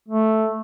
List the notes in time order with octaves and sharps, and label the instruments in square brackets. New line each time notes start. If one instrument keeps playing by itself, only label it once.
[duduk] A3